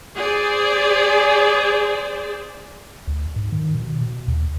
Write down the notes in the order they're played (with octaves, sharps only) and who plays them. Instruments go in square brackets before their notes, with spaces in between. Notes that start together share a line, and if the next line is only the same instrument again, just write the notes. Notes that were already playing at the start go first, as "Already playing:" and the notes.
[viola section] G#4 C5 D5
[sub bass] D2
G#2
D#3
B2
B2
D#2